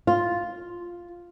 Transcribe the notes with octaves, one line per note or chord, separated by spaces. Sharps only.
F4